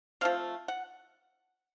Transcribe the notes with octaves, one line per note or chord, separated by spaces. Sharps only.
F3 A3 C4 F5
F#5